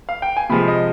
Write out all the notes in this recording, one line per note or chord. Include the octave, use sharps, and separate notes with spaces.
F5
G5
G#5
C3 F3 G#3 B5
D#5